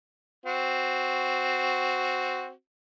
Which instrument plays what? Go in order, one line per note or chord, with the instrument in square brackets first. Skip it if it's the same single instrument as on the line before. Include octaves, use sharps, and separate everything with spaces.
[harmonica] C4 F#4